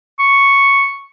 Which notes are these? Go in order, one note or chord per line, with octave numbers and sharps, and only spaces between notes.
C#6